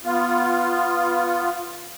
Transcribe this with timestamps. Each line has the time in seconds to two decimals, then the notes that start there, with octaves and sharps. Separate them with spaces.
0.05 B3 F4